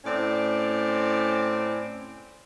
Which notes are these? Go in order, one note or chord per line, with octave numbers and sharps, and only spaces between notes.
A2 C4 C#4 D5